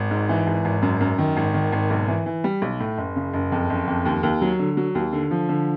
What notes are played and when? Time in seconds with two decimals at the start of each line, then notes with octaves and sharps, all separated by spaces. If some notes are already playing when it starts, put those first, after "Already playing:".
Already playing: G#1
0.11 G#2
0.29 E3
0.47 G#1
0.65 G#1
0.82 F#2
1.01 F#2
1.18 D#3
1.37 G#1
1.54 D#3
1.72 G#1
1.91 B1
2.08 E3
2.26 E3
2.44 G3
2.62 B1
2.80 A2
2.98 F#1
3.16 C#3
3.33 F#1
3.52 F2
3.70 F#1
3.87 F2
4.05 D#2
4.23 D#2
4.42 F#3
4.59 D3
4.77 F#3
4.95 D#2
5.13 D3
5.31 F3
5.49 D3